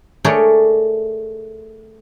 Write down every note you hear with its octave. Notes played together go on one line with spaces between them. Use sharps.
A3 G#4 A#4 C#5 D5